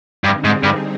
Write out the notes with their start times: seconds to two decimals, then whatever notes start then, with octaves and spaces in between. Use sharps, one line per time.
0.24 G2 D3 G3 C4 D#4 G#4
0.44 G#2
0.63 G2